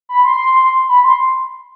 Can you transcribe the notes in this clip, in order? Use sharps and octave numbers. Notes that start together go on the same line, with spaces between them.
B5
C6
B5
C6